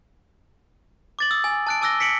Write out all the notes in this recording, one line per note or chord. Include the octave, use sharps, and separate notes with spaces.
D6 A6 F#7
D#6 E6
G#5
A5 F#6 D7
A5 D6 E6 F#6 A#6 G7
B6 C#7 D7 F#7